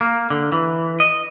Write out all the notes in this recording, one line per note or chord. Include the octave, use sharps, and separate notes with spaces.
A#3
D3
E3
D#5